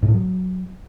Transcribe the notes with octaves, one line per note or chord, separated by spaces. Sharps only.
G#2
A2
F#3